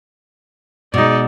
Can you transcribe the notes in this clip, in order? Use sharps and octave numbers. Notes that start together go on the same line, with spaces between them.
B2 G#3 D#4 D5